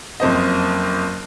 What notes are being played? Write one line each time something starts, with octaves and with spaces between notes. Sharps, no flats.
F#1 F2 C5 D#5